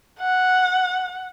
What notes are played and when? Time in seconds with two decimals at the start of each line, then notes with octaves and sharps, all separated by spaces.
0.19 F#5